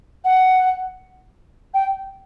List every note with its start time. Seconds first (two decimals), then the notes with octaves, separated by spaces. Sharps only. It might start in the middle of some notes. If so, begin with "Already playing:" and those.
0.25 F#5
1.74 G5